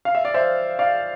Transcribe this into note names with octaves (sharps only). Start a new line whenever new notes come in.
F5
E5
D5
C5 E5
D5 F5